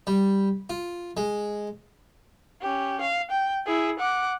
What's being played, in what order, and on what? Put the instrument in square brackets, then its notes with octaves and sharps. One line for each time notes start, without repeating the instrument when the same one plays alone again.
[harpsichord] G3
F4
G#3
[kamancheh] C#4 G4
F5
G5
E4 G#4
F#5 D6